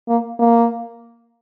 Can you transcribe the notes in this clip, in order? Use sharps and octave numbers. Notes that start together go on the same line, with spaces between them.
A#3
A#3